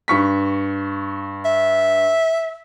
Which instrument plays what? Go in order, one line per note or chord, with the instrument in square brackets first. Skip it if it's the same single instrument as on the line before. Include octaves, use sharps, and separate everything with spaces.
[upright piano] G2 C#6 B6
[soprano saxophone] E5